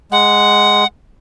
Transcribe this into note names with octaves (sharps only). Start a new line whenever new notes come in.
G#3 F#5